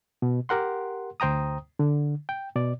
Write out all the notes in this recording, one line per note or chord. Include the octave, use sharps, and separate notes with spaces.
B2
G4 A#4 F#5 C6
D2 C5 G5 A#5 D#6
D3
G5
B2 D5